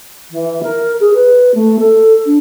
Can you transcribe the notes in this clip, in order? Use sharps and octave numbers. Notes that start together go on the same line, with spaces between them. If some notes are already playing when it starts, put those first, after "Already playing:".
E3
A#4
G#4
B4
A3
A4
D4